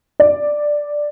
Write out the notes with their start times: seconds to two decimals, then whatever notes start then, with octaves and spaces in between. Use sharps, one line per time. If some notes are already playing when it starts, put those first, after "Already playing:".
0.20 D5